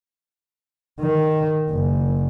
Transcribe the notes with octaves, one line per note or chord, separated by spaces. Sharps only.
D#3
F#1